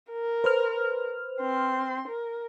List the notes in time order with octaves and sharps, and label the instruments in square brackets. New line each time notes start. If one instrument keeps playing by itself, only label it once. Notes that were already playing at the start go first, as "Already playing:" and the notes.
[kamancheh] A#4
[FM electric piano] B4 C5 F6
[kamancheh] C4 C6
A#4